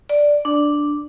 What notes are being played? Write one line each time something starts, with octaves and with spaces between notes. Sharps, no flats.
D5
D4